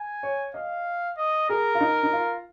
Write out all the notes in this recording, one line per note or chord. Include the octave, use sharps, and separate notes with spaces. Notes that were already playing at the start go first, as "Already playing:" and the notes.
Already playing: G#5
C#5
D#5 F5
D#5
G#4 A#4
F4
D#4
D#4
F4